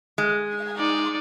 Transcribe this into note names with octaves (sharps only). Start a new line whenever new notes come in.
G#3
D#4 D5